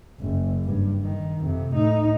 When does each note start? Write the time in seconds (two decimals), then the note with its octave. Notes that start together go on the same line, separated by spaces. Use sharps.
0.20 F#1
0.64 G2
1.02 D#3
1.42 F2 C3
1.72 A2 D#4